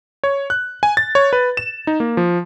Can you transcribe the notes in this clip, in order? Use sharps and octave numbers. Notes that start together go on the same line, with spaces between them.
C#5
F#6
G#5
A6
C#5
B4
E7
D#4
A#3
F3